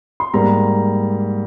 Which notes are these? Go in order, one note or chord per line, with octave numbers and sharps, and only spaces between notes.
C6
G#2 G3 A#3 A#5